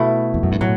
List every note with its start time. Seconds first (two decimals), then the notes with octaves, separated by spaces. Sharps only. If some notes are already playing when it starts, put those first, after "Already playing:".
Already playing: B2 A3 E4
0.34 E2
0.43 F#2
0.52 G2
0.61 A2 F#3